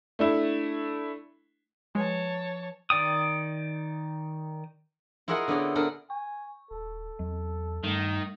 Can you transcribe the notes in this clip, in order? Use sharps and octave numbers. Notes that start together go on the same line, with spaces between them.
A3 D4 E4
F3 G#3 B4 C#5 G#5 A5
D#3 D5 G5 D#6
E4 F4 G#4 A#4 D#5 F#5
D3 B3 C#4 G#4 D5
B3 D4 A4 A#4
G#5 C#6
D#1 A4
E2 F#3
G2 D#3 G3 A3